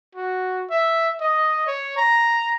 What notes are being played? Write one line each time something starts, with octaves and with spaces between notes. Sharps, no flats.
F#4
E5
D#5
C#5
A#5